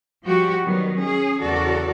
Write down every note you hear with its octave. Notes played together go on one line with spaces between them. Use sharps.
F3 G3 F#4 G4
D#3 F#3 G3 B3
C#4 G#4
E2 C#3 F#4 A4 A#4 D5